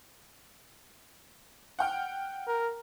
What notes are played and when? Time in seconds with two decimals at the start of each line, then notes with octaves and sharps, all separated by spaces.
1.79 F#5 G5 F6
2.47 A#4